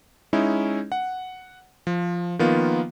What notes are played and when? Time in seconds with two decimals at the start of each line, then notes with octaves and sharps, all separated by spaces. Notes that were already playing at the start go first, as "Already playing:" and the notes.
0.33 G#3 C#4 D#4 E4
0.92 F#5
1.87 F3
2.39 D#3 F3 A#3 B3 F4